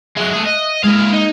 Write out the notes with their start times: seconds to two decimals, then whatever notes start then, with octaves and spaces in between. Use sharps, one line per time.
0.17 F#3 G#3 E5 F#6
0.33 A3 G#4
0.46 D#5
0.58 D#7
0.84 G#3 A#3 E4 F5
1.14 D#4